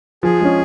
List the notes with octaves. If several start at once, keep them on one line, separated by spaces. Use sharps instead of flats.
F3 G#4
G#3 C#4